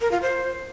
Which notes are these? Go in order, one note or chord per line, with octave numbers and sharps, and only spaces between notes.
A#4
F4
C5